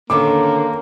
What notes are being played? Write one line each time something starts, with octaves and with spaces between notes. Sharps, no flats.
D3 D#3 A#3 C#4 D6